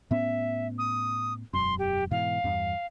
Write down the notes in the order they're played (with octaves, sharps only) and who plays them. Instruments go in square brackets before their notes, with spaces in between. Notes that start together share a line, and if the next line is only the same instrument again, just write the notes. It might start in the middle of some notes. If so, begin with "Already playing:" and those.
[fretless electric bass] A2 B3 C#4 [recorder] E5
[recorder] D#6
[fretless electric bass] E1 F#2 [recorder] C6
[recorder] G4
[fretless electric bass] G#2 B2 E3 [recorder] F5
[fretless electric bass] E2 G2